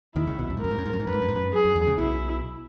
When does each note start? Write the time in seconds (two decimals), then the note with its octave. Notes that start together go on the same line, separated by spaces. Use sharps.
0.16 D#2 D#3 E4
0.27 C#2 C#3
0.38 B1 B2
0.50 F#2
0.57 G#2
0.61 F#2 A#4
0.71 G#2
0.78 F#2
0.85 G#2
0.93 F#2
1.00 G#2
1.07 F#2 B4
1.14 G#2
1.22 F#2
1.28 G#2
1.35 F#2
1.54 G#4
1.65 F#2
1.76 E2
1.87 C#2 C#3
1.98 B1 B2 E4